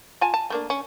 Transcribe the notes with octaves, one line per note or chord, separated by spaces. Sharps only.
F4 G#5 A5
A5
A3 A#3 D4
C#4